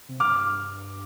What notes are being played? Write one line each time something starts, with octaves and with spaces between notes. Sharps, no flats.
C3
G2 D6 F6